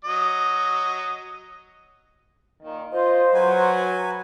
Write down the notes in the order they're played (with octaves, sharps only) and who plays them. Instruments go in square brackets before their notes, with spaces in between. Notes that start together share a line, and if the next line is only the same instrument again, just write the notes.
[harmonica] F#3 D#5
[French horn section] A#2 D#3
[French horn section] F4 D#5 [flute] C5
[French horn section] F#3 [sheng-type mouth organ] F#4 B4 G#5